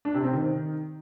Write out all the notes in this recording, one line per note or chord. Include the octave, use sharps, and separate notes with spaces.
D4
C3
C4
D#3